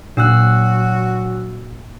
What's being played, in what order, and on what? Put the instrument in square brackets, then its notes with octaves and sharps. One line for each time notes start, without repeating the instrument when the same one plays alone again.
[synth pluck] A#2 [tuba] F#3 [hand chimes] D4 E6 F#6 [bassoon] F#4